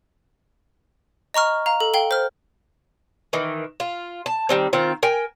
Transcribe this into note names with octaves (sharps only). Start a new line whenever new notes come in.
D#5 A#5 C#6 F6
F5 A#5
A4
F5 G5 G7
C5 F6
D#3 E3
F4
A5
D#3 G3 C4
D#3 C4 F4
A#4 G5 G#5